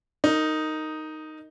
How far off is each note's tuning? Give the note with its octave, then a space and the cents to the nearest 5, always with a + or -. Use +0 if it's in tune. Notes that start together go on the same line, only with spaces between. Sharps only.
D#4 +0 A#4 -25